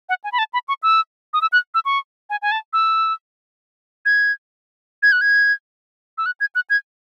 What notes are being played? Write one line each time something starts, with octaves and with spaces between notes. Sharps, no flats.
F#5
G#5
B5
A5
B5
C#6
E6
D#6
E6
F#6
E6
C#6
G#5
G#5
A5
E6
G#6
G#6
F#6
G#6
E6
F#6
G#6
F#6
G#6